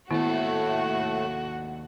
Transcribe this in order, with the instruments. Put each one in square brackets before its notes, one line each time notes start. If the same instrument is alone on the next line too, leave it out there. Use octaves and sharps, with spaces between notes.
[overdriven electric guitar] D#2 A4 [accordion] A2 A3 [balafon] D#3 B3 E4 [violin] F#4